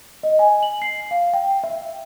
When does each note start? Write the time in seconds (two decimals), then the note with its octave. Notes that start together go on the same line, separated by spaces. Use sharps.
0.23 D#5
0.39 G#5
0.63 F#7
0.82 C7
1.11 F5
1.34 G5
1.64 E5